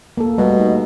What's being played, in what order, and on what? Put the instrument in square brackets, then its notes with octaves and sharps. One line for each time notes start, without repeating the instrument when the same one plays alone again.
[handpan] A#3 A4
[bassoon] B2 [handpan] G3 A3
[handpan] D#4